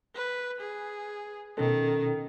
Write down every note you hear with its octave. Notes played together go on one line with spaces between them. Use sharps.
B4
G#4
B2 D#3 C#4 A4